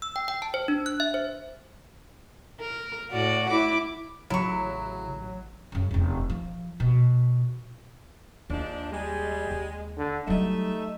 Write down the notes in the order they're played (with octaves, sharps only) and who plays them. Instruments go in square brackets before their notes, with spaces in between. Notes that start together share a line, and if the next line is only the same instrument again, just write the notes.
[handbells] E6
G5
G5
A5
C5
D4
F#6
E5
C5
[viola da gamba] A#4
[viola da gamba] A2 [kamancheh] F#4 D5
[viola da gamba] E4 [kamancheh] D6
[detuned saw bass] A1 [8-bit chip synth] C#3 [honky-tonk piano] F#3 [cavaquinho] E4 C#6
[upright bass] F#2 C#3
F1 E2
F3
B2
[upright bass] D#2 [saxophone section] F3 G#3 D4
[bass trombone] G3 [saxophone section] G#3
[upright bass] D#2
[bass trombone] D3
[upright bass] F#3 G3 [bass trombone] A3 [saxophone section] D#4 E5